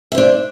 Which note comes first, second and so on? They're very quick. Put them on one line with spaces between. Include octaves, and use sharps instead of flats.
E5 C5 D4